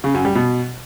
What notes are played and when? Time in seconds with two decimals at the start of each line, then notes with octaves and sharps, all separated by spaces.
0.04 C#3
0.14 F#2
0.25 G3
0.35 B2